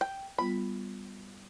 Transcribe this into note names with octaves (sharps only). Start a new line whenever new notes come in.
G5
G3 B3 F4 B5